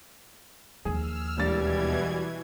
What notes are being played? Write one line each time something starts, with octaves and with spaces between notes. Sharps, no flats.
D#2 F3 G#4 E6 F6
E1 B2 E3 G3 G#6 A6